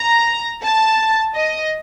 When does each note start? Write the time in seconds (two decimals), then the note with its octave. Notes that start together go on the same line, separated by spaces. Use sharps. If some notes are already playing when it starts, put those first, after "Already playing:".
Already playing: A#5
0.63 A5
1.36 D#5